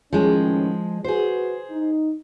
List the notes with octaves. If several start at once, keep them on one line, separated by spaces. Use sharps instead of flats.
A2 D#3 F3 G#3 C#4
F#4 G#4 B4 C5
D#4